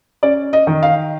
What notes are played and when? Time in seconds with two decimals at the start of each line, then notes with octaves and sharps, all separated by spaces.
0.23 C#4 D5
0.53 D#5
0.67 D#3
0.83 F5